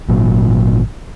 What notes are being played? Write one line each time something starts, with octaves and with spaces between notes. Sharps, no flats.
G#1 A#2 F#3